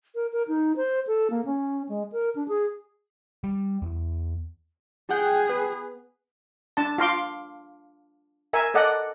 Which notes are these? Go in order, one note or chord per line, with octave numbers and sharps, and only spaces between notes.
A#4
A#4
D#4
C5
A4
A#3
C#4
G#3
A#4
D4
G#4
G3
E2
G#4 F#5 G5
B3
D4 A5
F4 F5 C6 D6
A#4 E5 G#5
A4 D5 D#5 F#5